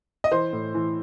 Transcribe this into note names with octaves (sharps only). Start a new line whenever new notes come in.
D#5
E3 C5
A2
E3